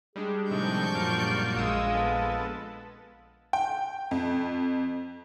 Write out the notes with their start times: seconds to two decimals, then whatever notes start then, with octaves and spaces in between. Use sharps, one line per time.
0.16 G3 G#3 D4 G#4
0.51 A2 C3 D#3 F3 D5 C#6 G6
0.95 F#2 A#2 F4
1.56 A#1 G#3 F5 D#6 E6
1.94 B3 A4
3.53 G5
4.11 F2